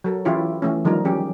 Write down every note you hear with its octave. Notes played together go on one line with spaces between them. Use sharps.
F#3 A4 A#4
E3 C#4 E4 F4 G4 C#5
E3 A3 C#4
D#3 F3 G3 D#4 A#4
F#3 C#4 G4 G#4